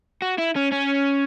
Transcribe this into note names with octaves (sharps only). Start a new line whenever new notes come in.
F#4
E4
C#4
C#4